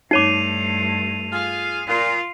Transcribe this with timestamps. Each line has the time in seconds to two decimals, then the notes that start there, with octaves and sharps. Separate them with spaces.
0.11 G2 A3 D#4 C#5 D6 C7 D#7 F7
1.33 F4 G#4 F5
1.88 A#2 F4